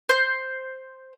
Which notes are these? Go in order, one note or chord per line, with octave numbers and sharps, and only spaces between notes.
C5 G6